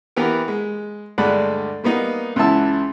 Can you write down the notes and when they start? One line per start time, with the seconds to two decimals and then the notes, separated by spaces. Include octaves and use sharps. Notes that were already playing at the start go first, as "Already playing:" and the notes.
0.16 E3 B3 G4 A#4
0.48 G#3
1.18 D2 G2 G#3 D5 F#5 B5
1.84 G3 A#3 B3 D#4
2.36 C#2 E3 E4 E5 A5 E6